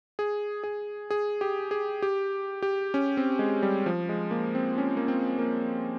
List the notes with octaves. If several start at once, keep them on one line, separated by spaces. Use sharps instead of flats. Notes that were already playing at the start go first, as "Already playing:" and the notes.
G#4
G#4
G#4
G4
G#4
G4
G4
C#4
C4
G#3
G3
F3
G#3
A#3
C4
C#4
A#3
C4
A#3